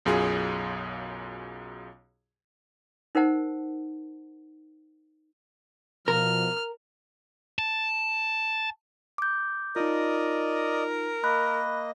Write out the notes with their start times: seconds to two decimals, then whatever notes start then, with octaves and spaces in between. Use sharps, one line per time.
0.05 B1 F#2 F4 G#4
3.15 D#4 A#4 C5 F#5 A5
6.08 B2 F3 A#4 F6
7.59 A5
9.18 D6 G6
9.76 D#4 F4 A#4 D5 D#5 D#6
11.24 A#3 D#5 B5 F#6